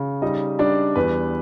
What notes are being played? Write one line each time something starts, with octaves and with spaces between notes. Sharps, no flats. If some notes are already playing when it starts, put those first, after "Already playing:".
Already playing: C#3
G3 D#4 D#5
G3 D4 D5
E2 B4